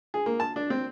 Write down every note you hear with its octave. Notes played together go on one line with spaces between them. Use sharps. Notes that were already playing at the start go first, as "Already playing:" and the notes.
G#4
A#3
A5
D4
C4